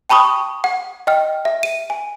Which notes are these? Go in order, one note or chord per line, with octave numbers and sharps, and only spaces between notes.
G5 A5 B5 C#6 D#6
F#5
D#5 G5 F6
E5
D#7
G#5